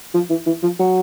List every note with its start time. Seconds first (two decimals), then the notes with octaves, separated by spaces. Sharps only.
0.14 F3
0.30 E3
0.46 E3
0.63 F3
0.79 F#3